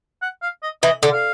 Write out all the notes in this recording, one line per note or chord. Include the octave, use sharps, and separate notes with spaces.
F#5
F5
D#5
E3 D#5
D3
F5